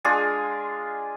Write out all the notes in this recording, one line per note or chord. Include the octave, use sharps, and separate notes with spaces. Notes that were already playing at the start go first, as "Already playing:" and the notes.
G#3 D4 F4 G#4